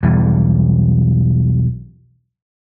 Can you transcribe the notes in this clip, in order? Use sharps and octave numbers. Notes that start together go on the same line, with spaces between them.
B1 E2 E3 G3